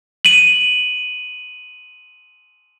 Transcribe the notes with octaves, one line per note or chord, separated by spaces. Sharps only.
D#7 F#7